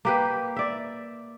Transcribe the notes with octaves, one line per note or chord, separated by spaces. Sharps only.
A#3 G4 B4
D5 E5